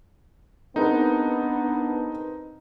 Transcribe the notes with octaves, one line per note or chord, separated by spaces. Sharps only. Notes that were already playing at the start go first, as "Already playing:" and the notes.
B3 C4 D4 D#4 G#4 A#4 B4